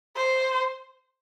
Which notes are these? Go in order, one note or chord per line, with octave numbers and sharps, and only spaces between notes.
C5